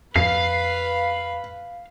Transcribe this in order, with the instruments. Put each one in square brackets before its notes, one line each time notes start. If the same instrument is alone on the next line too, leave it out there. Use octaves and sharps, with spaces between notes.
[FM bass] F2 [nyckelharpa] B4 B5 [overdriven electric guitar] F5 [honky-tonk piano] C7